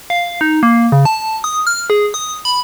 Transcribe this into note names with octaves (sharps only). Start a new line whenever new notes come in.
F5
D#4
A#3
C#3
A5
D#6
F6
G#4
D#6
B5